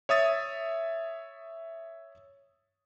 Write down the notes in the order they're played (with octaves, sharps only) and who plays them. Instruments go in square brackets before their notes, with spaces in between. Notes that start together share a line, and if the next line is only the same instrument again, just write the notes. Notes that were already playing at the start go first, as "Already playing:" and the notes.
[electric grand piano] C#5 E5 D#6 A6